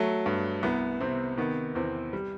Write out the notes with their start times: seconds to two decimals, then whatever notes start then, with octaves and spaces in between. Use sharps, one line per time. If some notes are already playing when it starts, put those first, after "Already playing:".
Already playing: F#3 A3
0.26 G2
0.63 C2 B3
1.00 C3 C4
1.38 D#3 B3
1.75 E2 C4
2.13 G3